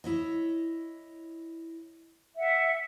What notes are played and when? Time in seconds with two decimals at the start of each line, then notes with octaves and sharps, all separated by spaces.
0.04 E4 C#5 D#5
2.36 E5 F#5